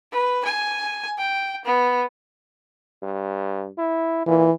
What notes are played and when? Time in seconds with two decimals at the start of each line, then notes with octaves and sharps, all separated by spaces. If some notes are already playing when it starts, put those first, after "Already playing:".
0.12 B4
0.45 G#5
1.18 G5
1.65 B3
3.02 G2
3.78 E4
4.27 A#2 E3